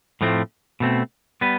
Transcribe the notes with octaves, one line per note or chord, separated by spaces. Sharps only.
A2 F3 A3 C4
B2 A3 C4
G3 B3 B4